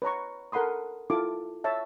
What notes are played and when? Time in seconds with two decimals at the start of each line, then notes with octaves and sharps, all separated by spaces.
0.02 B4 C#5 A#5 C#6
0.52 A4 A#4 F#5 B5 C6 D#6
1.10 E4 F4 A4 D6
1.64 C#5 E5 A5